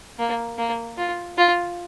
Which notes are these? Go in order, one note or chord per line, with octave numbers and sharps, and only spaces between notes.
A#3
A#3
F4
F4